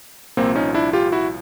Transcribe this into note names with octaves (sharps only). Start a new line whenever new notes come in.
C2 A#2 F3 A#3 C4
C#4 D#4
D4 E4
F4 G4
E4 F#4